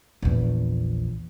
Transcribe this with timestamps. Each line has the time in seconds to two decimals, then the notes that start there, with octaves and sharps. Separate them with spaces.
0.22 A#1 E2